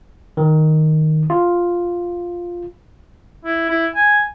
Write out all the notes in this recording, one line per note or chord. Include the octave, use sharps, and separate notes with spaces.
D#3
F4
E4
E4
G#5